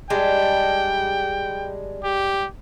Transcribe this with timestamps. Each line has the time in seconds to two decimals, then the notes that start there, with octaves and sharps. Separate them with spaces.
0.10 G3 G#3 D4 G5
2.04 G4